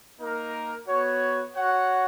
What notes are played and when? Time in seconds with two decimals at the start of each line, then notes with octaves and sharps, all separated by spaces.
0.19 A#3 D#4 A#4
0.87 B3 F#4 C#5
1.55 F#4 C#5 F#5